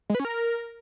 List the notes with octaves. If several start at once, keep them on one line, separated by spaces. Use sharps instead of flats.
G#3
B4
C#4
A#4